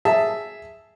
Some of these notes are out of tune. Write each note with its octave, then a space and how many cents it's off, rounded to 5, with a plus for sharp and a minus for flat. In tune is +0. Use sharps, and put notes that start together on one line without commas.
G#4 +0 E5 +0 A5 +0